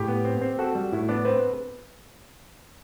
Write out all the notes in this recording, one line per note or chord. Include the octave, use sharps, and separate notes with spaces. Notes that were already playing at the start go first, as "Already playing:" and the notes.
Already playing: A2 G4
B3
C4
C4
F#4 A4
G3
A2 E4
B3 D4
C4 B4